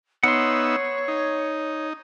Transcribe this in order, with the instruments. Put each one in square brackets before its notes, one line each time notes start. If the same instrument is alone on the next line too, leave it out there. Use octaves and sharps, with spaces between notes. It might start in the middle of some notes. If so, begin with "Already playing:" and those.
[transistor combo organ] B3 D#4 E5 [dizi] C#5 [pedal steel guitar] F#5 C6
[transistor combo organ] D#4